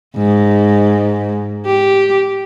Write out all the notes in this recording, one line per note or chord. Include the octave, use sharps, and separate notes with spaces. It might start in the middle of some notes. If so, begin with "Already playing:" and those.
G#2
G4